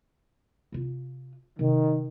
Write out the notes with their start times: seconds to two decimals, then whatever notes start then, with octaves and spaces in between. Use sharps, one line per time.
0.72 C3 F4
1.59 C3 D#3